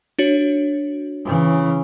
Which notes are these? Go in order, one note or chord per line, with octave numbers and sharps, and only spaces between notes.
D4 F#4 C#5
C#3 E3